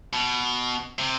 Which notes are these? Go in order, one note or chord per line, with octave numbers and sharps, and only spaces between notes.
B2
C3